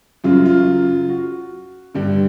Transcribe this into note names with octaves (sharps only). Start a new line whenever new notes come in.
F#2 C#3 F#3 F4
F4
F#4
G2 D3 G3